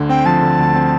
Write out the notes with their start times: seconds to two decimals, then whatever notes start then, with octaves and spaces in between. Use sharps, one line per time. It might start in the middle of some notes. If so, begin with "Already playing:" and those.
Already playing: D2 D3
0.09 C4 G5
0.26 F3 A5
0.42 D3
0.59 D2
0.76 C4